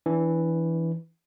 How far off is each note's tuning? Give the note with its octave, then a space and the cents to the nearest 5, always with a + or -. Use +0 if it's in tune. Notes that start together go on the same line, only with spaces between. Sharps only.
E3 +0 D4 -25